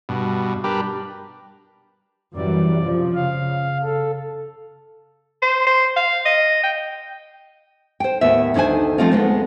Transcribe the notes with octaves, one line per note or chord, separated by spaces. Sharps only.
G2 B2
G3 D4 G4 A#4 B4
F#2 E3 G3 D5
C3 F3
C#3 F5
A4
C5
C5
F5
D#5
G5
C5 G5
D#2 A2 B3 E5
D2 D#3 D4 C5 G#5
F3 A3 C4 D#4 F4
D2 G#3 B3